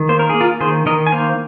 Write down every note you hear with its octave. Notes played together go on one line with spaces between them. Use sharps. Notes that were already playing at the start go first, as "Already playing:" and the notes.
Already playing: D#3
A#3 C5
A#4
A#3 G#4
F4 A#4
D#3 G#4 C5
D#3 A#4 D#5
G#5
A#3 C5 F5